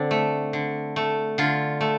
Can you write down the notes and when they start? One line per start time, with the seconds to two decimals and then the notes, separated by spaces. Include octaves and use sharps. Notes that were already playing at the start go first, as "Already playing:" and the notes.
Already playing: D3 C4 D4
0.11 A3
0.53 D3
0.96 A3
1.38 D3 F4
1.81 A3